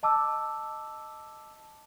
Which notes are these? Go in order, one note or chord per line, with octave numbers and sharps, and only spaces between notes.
D#5 A5 D6 E6